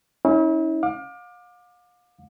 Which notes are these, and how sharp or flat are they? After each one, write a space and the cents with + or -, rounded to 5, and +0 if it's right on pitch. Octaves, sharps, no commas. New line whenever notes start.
C#4 +0 E4 -40
F5 +35 D6 +25